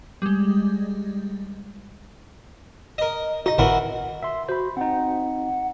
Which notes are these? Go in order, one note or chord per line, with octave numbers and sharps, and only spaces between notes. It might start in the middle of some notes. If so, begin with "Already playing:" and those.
G3 G#3
A#4 D#5
D#4 F#4 D#5
G#1 A2 E3 F#4 A#4
E5 C6
F#4 C5 B5
C4 D#4 F#5